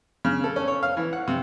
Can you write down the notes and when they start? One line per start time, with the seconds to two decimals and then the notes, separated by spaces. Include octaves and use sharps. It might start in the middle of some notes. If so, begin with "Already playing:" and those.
0.25 C#3
0.44 A4
0.56 C#4
0.68 C#5
0.83 F5
0.97 E3
1.13 F#5
1.28 C3